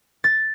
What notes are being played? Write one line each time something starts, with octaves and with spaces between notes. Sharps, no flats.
A6